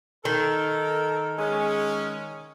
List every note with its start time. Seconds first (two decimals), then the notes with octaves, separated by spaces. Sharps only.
0.25 D#3 A4 A#4
1.39 G#3 C#4